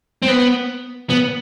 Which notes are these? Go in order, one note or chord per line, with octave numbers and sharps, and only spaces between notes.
C4
B3
B3